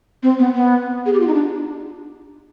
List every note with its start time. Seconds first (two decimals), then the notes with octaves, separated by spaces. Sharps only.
0.23 C4
0.39 B3
0.55 B3
1.06 G#4
1.13 G4
1.20 F4
1.27 D#4
1.34 D4